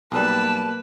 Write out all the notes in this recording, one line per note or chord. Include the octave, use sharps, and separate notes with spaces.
B1 G3 A#3 B4 A5